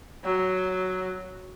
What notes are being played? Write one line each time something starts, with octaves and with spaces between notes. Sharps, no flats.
F#3